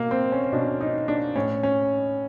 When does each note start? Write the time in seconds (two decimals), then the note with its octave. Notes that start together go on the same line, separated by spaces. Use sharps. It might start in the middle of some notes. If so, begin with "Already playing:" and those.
Already playing: B2 A#3
0.11 C4
0.32 C#4
0.53 B2 D4
0.81 D#4
1.08 D4
1.36 A2 C#4
1.63 C#4